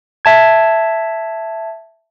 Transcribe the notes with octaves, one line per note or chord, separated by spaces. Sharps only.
E5 A5 G#6